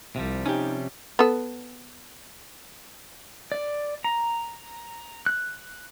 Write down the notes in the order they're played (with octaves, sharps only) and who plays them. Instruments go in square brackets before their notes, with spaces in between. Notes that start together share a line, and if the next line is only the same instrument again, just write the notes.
[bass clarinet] C2 [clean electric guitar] C3 F3 G3
[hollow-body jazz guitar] C#4 G4 [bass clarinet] D#4
[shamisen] B3 A4
[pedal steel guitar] D5
A#5
F#6